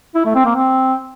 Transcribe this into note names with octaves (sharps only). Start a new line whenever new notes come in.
E4
A3
C4
A#3
C4